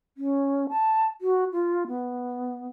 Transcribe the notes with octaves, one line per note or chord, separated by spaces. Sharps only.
C#4
A5
F#4
F4
B3